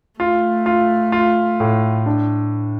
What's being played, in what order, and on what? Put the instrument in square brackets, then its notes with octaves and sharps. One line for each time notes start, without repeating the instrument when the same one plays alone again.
[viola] A3 [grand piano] F4
[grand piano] F4
F4
A2
D4